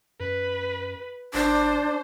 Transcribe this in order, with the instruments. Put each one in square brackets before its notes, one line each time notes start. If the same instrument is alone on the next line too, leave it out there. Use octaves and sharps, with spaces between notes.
[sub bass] F#2 [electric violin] B4
[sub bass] G#1 [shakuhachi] D4 [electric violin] C5